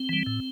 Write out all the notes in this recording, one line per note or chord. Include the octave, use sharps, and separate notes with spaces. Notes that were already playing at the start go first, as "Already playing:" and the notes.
Already playing: C4
E3 G3
A2